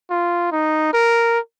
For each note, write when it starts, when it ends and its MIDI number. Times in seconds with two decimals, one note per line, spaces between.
0.11 0.49 65
0.52 0.90 63
0.93 1.39 70